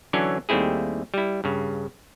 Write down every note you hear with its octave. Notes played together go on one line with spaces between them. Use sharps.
D3 E3 F#3 C#4 D4
D#2 G3 A3 C4 E4 G#4
G3 E4
G2 C#3